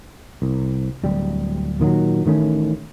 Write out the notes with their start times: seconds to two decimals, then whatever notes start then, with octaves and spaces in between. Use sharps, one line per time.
0.42 C2
1.04 D1 G3
1.80 A#2 D#3 E3 F#3
2.26 A1 D#3 A3 C#4